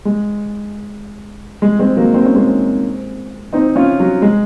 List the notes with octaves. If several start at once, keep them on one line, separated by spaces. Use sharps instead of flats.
G#3
G#3
G#3 C4
F#3 A#3
C4
C#4
G#3 C4
C4 D#4
C#4 F4
F#3
G#3